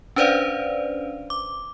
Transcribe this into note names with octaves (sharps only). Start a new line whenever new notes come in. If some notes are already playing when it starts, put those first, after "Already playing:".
C#4 D4 B4 C5 D5 F5
D6